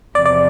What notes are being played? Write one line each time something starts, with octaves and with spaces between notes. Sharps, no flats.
E2 C3 F3 D5
D5